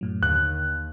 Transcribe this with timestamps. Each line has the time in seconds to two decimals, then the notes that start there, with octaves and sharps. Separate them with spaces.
0.01 F#2 A2 F#3
0.23 D#2 D3 F#6